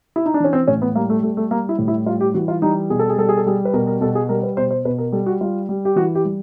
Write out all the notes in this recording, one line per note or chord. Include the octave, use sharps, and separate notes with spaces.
E4
D#4
D4
E3 C#4
C4
A2 C#4
B3
G3 A#3
A3
G3 A3
A3
G3 A#3
E4
A2
E4
G3 F4
G4
E3 F#4
F4
G3 D#4
B2 G#4
A4
G#4
G3 A4
G#4
A4
G3 G#4
B4
B2 A#4
A#4
B2 A4
G#4
G3 A#4
B4
B2 C5
C5
B2 B4
A#4
G3 A4
F#4
G3 F4
G3
G4
E3 F#4
G4
G3